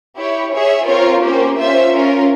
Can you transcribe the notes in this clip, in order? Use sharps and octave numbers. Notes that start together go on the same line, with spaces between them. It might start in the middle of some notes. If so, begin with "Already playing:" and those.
E4 G4 C#5
G#4 C#5 E5
C4 F4 A#4 C#5
A#3 C#4 G4 C5
C#4 F4 C5 E5
C#4 F4 A#4